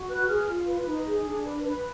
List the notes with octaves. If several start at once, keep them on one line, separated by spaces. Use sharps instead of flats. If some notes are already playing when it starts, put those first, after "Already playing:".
Already playing: F#4
B4 F#6
G#4 F6
F4
B4
D#4
G#4
D4
B4
B4